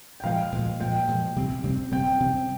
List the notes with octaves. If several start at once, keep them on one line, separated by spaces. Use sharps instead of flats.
G5
A#2 F3 G#3 F5
A#2 F3 G#3
A#2 F3 G#3 G5
A#2 F3 G#3
C3 G3 C4
C3 G3 C4
C3 G3 C4 G5
C3 G3 C4